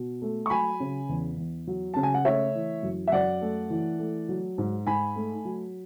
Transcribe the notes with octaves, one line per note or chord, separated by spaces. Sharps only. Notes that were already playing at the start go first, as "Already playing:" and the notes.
Already playing: B2
A3
C#6
F#3 G#5 B5
C#3
E2
E2
F#3
C#3 A5
G#5
F#5
A3 C#5 E5
E3
F#2
E5
F#2 D5 F#5
A3
E3
A3
F#3
G#2
G#2 G#5 B5
A3
F#3